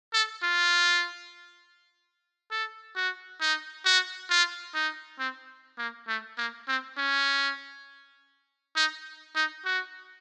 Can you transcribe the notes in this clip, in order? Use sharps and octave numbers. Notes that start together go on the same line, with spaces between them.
A4
F4
A4
F#4
D#4
F#4
F4
D#4
C4
A#3
A3
A#3
C4
C#4
D#4
D#4
F#4